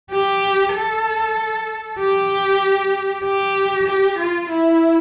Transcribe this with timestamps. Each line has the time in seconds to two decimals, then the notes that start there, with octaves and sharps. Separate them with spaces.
0.11 G4
0.74 A4
1.99 G4
3.24 G4
3.87 G4
4.19 F4
4.50 E4